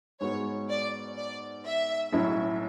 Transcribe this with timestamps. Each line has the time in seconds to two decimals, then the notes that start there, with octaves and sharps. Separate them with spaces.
0.20 G#2 G#3 B3 F#4 C#5
0.69 D5
1.17 D5
1.65 E5
2.12 B1 A2 F#3 C#4 E4